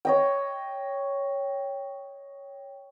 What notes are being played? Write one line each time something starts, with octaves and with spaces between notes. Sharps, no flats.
C#5 D#5 G5